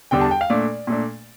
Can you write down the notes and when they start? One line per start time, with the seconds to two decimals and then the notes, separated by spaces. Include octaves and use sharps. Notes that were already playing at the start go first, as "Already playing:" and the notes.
0.11 E2 D3 G3 D4 G5
0.21 A5
0.31 G5
0.41 F5
0.50 A#2 A3 D4 D5
0.87 A#2 A3 D4